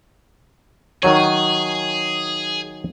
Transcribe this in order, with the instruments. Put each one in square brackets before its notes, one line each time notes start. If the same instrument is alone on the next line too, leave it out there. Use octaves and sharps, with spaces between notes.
[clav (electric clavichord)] D#3 F#3 C#5 [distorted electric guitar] G#4